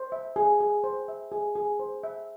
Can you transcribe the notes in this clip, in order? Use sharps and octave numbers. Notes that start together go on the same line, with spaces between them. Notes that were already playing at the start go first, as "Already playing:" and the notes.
Already playing: C5
E5
G#4
G#4
C5
E5
G#4
G#4
C5
E5